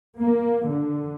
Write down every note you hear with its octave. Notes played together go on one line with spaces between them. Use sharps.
A#3
D3